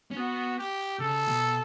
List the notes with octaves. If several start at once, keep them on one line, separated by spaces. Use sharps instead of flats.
C#4
B3 F#4
G4
C#3 A4
B2